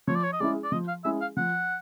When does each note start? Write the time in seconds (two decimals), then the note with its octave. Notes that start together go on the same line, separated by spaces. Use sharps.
0.07 F3 C#5
0.15 D5
0.24 C#5
0.33 D#5
0.40 G#3 C#4 E4 G#4 D5
0.64 D5
0.72 F3 D#5
0.88 F5
1.04 G#3 C#4 E4 G#4 E5
1.21 F5
1.37 F3 F#5